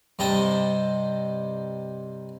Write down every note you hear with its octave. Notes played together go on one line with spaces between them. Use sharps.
G2 C3 D#5 G5 A5